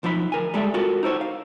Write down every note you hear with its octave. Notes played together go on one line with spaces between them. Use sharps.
B1 F3 D#4 C#5 B5
D2 A#4 G#5
G3 G#3 A4 D5 E5
F4 F#4 A4 A#4
D#4 E4 C5 C#5
F5